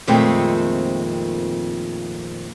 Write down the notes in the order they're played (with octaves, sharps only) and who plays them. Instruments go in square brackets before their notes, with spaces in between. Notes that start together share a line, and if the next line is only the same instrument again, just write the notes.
[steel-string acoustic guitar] F2 A#2 D#3 G#3 A3 C4